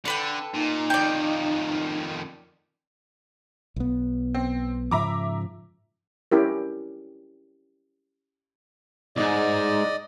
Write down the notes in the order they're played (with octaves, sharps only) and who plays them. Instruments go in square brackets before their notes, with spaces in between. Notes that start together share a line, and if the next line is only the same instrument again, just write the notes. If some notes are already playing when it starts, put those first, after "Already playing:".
[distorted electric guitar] D3 [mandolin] A4 B4 G5
[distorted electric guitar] A#2 [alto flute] D#4
[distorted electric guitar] F2 D#3 [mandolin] D5 G5
[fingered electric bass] B1 B3
[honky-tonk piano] C4
[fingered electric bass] G#2 C#3 F3 [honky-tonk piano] E5 A#5 D6
[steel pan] C#4 E4 G4 A#4
[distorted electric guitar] C2 G#2 [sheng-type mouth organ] D5 D#5